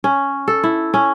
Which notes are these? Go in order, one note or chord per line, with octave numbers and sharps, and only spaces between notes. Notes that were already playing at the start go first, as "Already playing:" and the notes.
C#4
A4
E4
C#4